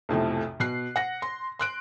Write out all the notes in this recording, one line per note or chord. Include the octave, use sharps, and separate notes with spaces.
B1 F2 A2 C3
B2 F#6 C7
F#5 A#6
C6
C6 F#6 D7